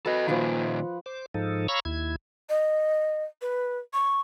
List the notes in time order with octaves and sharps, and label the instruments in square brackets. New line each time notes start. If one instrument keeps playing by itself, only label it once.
[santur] F#4 B4 [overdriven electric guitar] A4 D#5
[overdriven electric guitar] A#2 D#3 [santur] F3 F#5 B5
[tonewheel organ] C5 D6
G#2 F3 D#4 A4
C#5 F5 A#5 B5 C#6 E6
D#2 E4 G#6
[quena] D#5
B4
C#6